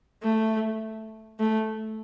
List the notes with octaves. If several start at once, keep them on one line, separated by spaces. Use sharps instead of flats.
A3
A3